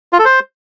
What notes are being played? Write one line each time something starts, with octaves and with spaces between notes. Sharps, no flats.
F4
A4
C5